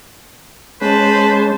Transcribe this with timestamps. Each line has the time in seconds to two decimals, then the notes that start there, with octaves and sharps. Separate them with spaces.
0.81 G#3 C#4 B4 C5 A5